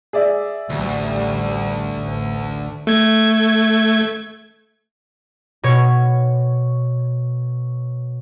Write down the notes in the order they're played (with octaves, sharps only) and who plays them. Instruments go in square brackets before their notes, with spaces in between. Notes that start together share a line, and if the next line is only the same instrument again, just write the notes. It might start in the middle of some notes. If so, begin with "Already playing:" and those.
[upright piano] G#4 D5 E5
[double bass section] A1 G3 [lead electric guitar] D2
[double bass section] A1
[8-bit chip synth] A3 G#6
[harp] B2 C#5